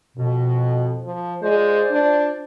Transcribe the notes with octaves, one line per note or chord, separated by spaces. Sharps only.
F2 B2
F3
G#3 F4 C5 D5
D4